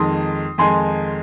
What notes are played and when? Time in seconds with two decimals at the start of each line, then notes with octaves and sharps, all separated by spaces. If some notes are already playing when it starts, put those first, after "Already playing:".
Already playing: F2 D#3 G#3 D#4 C6 D#6
0.58 F2 D#3 G#3 D#4 G#5 C6